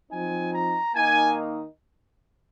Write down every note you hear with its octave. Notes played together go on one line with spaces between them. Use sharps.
F3 C4 D#4 G#5
A#5
D#3 A#3 D#4 G#5